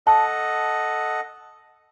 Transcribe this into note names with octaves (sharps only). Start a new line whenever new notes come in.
A4 D#5 F#5 A5